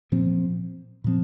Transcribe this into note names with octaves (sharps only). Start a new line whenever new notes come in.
A#2 F3 C4
A#2 F3 C4